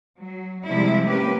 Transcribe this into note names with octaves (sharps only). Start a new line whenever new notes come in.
F#3
C3 F3 G3 G#3 E4
A#3 C#4 G4 B4